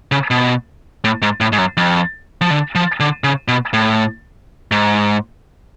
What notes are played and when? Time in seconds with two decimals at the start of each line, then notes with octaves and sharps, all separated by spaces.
0.12 C#3
0.31 B2
1.04 A2
1.22 G#2
1.41 A2
1.53 G#2
1.59 F#2
1.77 F2
2.41 F3
2.51 D3
2.75 F3
3.00 D3
3.24 C#3
3.48 B2
3.73 A2
4.72 G#2